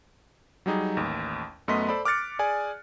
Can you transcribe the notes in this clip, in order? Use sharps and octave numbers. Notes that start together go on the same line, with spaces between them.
F#3 G3 D#4 G#4
A1 D#2
F#2 A3 B3 D#5 C6 B6
A4 C5 D5 B5
D6 F6 F#6 A6 C#7 D7
G#4 D5 G#5